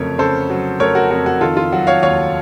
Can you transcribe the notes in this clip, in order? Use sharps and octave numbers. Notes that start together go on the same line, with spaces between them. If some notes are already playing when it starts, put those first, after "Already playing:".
Already playing: F2 C#3 F#3 A3 A#4 C#5
C#3 A4 C5
F#3
A3 A#4 C#5
F#4 A#4
F2 F#4
F#4
D#3 F4 A4
F4
F#3 F#4
C#5 F5
D#2 C#5 F5